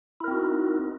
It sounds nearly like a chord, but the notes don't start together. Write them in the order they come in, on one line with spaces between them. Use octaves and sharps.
E4 A#4 C4 F#4 D#4